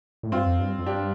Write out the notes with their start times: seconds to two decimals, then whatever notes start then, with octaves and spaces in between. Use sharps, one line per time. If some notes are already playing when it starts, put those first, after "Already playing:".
0.23 A2
0.32 G2 C4 F4
0.46 F2
0.60 G2
0.79 F2
0.86 G2 D4 G4